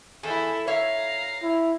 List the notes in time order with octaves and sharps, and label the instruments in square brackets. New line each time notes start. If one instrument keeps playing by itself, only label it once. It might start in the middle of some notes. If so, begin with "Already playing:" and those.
[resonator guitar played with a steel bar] E2 G#4 [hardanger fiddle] E4 A4
[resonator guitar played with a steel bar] C#5 E5 [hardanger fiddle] F5 A#5
[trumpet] E4